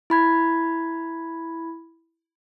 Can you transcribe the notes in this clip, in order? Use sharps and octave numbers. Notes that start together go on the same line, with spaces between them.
E4 B5 G#6